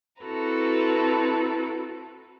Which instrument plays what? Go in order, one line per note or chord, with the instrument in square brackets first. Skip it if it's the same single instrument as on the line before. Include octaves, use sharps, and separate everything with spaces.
[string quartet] C4 E4 F#4 A4 B4 A#5